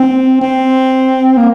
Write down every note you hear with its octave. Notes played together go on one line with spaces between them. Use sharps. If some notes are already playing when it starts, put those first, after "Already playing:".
Already playing: C4
C4
A#3